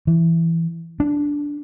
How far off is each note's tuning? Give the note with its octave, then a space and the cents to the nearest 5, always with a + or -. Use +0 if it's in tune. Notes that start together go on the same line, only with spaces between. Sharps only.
E3 +10
D4 -10